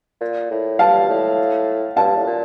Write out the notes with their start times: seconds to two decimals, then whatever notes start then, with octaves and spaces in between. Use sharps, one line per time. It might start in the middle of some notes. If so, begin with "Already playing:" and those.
0.21 A#2
0.51 A2
0.79 G2 F5 A5
1.09 A2
1.96 G2 F5 A5
2.17 A2
2.26 A#2